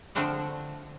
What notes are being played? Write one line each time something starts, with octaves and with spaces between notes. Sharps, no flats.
D3 F3 A3 C4 D4 F5